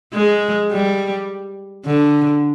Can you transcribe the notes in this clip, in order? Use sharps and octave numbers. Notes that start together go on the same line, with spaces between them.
G#3
G3
D3